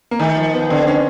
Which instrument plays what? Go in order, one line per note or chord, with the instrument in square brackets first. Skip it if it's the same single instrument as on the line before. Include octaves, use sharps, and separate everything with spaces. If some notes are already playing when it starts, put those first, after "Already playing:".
[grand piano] A#3
[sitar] D#3 [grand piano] A3
[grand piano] F3
B3
[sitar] D3 [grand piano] C4
[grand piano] C#4